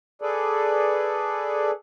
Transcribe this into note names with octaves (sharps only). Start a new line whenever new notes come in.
G#4 A4 B4 D5